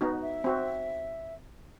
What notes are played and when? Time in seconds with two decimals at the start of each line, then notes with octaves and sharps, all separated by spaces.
0.01 B3 D#4 F#4
0.22 E5
0.44 C4 F#4